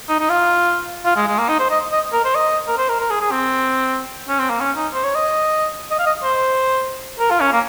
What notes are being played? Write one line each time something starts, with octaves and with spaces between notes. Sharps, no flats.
D#4
D#4
F4
F4
G#3
G#3
A#3
D#4
C5
D#5
D#5
A#4
C5
D#5
A#4
C5
A#4
A#4
G#4
G#4
C4
C#4
C4
A#3
C#4
D#4
C5
C#5
D#5
D#5
F5
D#5
C5
A#4
F4
C#4
A#3